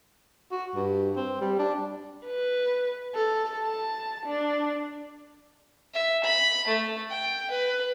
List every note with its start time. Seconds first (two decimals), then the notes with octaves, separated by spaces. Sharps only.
0.52 F#4
0.75 G2
1.17 C4
1.41 G3
1.59 D4
2.26 B4
3.15 A4
3.64 A5
4.26 D4
5.94 E5
6.24 B5
6.67 A3
7.11 G5
7.51 B4